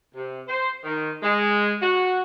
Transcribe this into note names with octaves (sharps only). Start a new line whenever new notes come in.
C3
C5
D#3
G#3
F#4